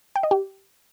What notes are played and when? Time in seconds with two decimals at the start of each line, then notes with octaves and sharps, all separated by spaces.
0.16 G5
0.23 D#5
0.31 G4